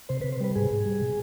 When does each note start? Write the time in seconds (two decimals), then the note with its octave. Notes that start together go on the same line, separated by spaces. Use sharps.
0.09 C3 C5
0.21 C3 B4
0.32 C5
0.41 G3 B4
0.55 G#2 G#4
0.71 G#2
0.85 G3
1.01 B2